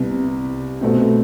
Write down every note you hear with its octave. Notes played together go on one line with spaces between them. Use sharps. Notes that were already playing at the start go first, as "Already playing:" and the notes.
Already playing: C2 C3 B3
B2 A3 C4